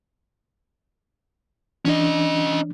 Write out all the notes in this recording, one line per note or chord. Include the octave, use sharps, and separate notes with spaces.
E3 C#4 D4 D#5